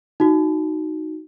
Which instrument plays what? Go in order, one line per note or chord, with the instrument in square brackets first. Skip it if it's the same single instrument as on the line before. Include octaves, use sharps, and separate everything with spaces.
[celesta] D#4 F#4